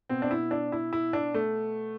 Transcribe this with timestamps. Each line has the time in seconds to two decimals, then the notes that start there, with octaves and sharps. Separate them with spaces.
0.09 B2 C4
0.22 D4
0.31 E4
0.51 D4
0.72 E4
0.93 E4
1.13 D4
1.34 A3